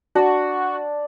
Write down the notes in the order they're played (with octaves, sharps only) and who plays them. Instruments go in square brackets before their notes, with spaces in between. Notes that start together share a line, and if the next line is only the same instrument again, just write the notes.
[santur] D4 D5 [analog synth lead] F#4